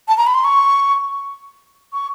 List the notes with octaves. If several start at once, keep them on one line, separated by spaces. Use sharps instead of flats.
A5
A#5
B5
C6
C#6
C#6